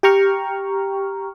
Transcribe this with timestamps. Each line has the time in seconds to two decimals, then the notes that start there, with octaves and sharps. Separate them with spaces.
0.03 G4 G5 A#5 C#6 F6